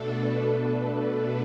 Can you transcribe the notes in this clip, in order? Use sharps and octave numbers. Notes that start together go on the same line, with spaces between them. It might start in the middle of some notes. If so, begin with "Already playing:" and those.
Already playing: B2 A3 D4 A4
B4
A4
B4